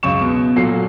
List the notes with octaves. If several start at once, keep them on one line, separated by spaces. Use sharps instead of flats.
C#2 F#2 C#6 E7
B2
A#2 F#3 A4 C7